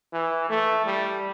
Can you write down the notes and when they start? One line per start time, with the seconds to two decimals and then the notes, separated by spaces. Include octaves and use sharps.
0.13 E3
0.49 A3
0.86 G3